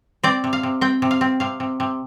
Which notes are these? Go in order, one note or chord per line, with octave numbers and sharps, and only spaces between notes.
C4 D5
C3
F5
C3
C4 G5
C3
F5
C4
C3 F5
C3
C3